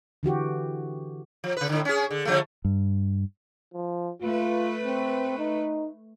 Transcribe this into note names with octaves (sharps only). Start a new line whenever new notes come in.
D3 E3 F#4 G4
F3
C#3 B4
A2 D3
C#4 G#4
D3
D3 F3 A3
G2
F3
A3 F4 B4
C4
D#4